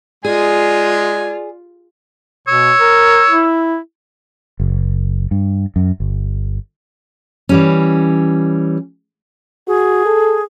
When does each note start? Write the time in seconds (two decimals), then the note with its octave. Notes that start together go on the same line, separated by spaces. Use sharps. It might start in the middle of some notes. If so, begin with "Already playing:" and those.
0.25 G#3 F4 G#4 D5 G#5
2.48 B2 C#5 E6
2.80 A#4
3.30 E4
4.60 F#1
5.31 G2
5.76 F#2
6.00 G1
7.49 E3 G3 C#4
9.67 F#4 G#4
10.06 A4